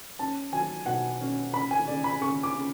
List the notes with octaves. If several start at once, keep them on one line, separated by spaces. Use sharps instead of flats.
C#4 A5
F#3 G#5
B2 F#5
C#4
C#3 B5
G#5
C#3 D5
B5
C#3 C#6
D6
C#3